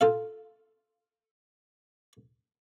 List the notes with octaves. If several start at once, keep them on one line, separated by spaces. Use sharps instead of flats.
F4 A4 F5